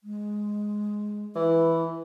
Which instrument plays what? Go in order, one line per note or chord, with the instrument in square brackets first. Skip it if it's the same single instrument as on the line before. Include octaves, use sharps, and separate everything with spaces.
[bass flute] G#3
[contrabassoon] E3 [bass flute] E4